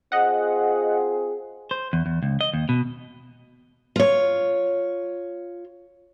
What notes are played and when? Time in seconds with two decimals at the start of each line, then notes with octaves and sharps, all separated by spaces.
0.12 C4 F4 G#4 D#5 F#5
1.71 C5
1.93 E2
2.06 E2
2.23 C#2
2.41 D#5
2.54 D#2
2.69 B2
3.96 F4 C#5